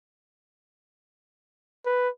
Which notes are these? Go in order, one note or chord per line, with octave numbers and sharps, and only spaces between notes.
B4